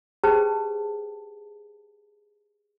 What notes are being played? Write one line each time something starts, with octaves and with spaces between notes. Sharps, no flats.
G4 G#4 B4 C5 G5 A5